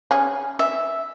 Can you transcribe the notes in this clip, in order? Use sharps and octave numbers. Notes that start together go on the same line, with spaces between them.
C#4 G#4
E5